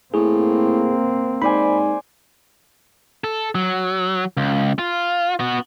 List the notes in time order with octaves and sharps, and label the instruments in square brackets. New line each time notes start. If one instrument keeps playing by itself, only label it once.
[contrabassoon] A2 [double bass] A#3 C4 [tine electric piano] G#4
[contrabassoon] G#2 [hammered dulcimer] C5 D5 G#5 [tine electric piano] B5
[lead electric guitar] A4
F#3
C#2
F4
B3 F#4